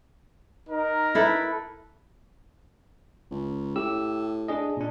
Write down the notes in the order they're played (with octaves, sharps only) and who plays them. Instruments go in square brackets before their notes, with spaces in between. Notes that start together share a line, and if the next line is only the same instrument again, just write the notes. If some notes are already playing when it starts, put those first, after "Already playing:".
[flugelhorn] D#4 [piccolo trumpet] A#4
[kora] E4 A4 B4
[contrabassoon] C#2
[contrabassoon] A2 [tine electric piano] G4 E6
[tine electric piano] D4 G#4 D#5
A#2 D4